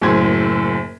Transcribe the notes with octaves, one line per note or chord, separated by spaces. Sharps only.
F#1 F#2 A2 C5 G#6